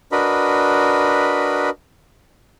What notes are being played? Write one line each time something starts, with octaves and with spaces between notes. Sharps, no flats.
D4 F#4 A#4 B4 D#5 B5